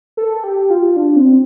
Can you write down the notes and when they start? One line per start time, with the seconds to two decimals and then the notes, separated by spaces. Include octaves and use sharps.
0.17 A4
0.44 G4
0.70 F4
0.96 D4
1.16 C4